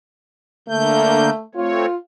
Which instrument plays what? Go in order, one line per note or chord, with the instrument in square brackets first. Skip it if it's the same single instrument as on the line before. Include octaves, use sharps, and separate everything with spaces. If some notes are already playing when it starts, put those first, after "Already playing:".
[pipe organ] D3 A#3 G6 [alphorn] A3
[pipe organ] A3 C4 C#5 [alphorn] F4